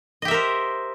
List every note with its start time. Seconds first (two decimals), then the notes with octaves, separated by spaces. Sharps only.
0.22 D#5
0.25 G4
0.28 E5
0.31 A#4
0.34 C5